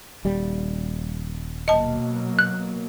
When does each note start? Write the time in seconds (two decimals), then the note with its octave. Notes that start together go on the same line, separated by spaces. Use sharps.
0.25 D#1 G3
1.68 B2 F#3 A#3 D#5 A5
2.39 F#6